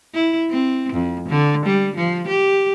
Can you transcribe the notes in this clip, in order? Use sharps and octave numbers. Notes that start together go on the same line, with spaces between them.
E4
C4
F2
D3
G3
F3
G4